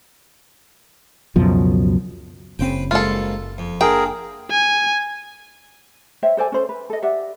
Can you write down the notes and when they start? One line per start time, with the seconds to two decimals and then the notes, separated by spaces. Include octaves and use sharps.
1.36 C#2 F#2 B2 F3
2.59 F#1 C#3 C4 B4 C5 G5
2.91 G#2 G3 A#3 F4 A4
3.58 F2
3.81 D3 A#3 D4 G#4 A#4 G5
4.51 G#5
6.23 C5 C#5 E5 G5
6.37 A4 C5 D5 G#5
6.52 C#4 A4 C5
6.69 B4
6.90 A4 D#5
7.02 G4 D5 E5 F#5